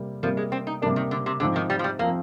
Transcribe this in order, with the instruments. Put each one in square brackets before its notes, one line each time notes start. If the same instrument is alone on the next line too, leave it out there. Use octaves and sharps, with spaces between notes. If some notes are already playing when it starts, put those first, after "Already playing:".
Already playing: [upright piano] C3 G3 A#3
[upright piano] C3 G3 A#3 [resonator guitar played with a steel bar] F3
[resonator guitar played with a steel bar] G#3
C4
D#4
[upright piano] C3 G3 A#3 [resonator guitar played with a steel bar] D4
[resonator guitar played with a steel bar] D#3
D3
C3
[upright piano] G#2 F3 C4 [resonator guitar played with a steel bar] D3
[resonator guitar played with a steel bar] D#3
G3
F3
G3
[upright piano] F3 C4 [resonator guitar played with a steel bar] A#3